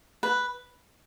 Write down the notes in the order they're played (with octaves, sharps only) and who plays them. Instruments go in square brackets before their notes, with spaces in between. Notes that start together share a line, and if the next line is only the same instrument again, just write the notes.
[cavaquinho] B4